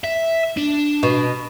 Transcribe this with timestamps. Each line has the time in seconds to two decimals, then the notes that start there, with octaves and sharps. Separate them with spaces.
0.04 E5
0.57 D4
1.03 B2